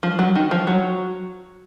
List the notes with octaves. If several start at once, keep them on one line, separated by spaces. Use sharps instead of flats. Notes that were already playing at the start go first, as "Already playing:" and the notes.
F3
F#3
D#3
F3
F#3